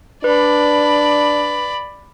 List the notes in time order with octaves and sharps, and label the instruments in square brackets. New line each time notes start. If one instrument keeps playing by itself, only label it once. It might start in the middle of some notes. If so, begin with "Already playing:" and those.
[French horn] D4 [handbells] B4 [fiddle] D5 B5